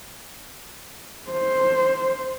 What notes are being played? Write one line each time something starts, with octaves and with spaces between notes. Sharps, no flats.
C5